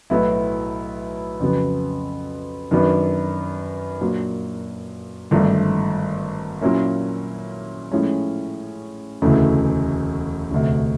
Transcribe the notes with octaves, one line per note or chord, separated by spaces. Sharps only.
B1 A2 F#3 B3 E4
F2 C#3 F#3 B3
F#2 D#3 F#3 B3 D4
A#2 F#3 A#3 D4
G#1 G2 D3 F3 A3
A#2 F#3 A#3 C#4 E4
A2 F3 G#3 C#4
E1 D2 C#3 E3 A3
E1 D2 C3